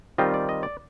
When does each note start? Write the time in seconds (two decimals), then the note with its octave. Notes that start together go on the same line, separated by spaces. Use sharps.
0.18 D#3 G3 C4 F4 D#5
0.34 D5
0.49 D#5
0.63 D5